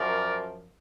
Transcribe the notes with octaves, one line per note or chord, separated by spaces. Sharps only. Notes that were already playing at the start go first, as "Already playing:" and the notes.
Already playing: F#2 F3 A#4 D5